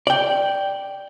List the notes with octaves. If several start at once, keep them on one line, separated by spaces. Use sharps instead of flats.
D5 G5